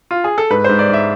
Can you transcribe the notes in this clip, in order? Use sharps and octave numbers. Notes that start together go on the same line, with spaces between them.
F4
G#4
A4
G#2 B4
G#2 C5
D5
G#2 E5